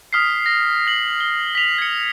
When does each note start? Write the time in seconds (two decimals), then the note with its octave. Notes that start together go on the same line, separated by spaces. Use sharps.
0.13 D#6 F6 B6 C7
0.46 A#6
0.87 A#6 F#7
1.20 G7
1.55 B6 F7
1.78 G#6 C#7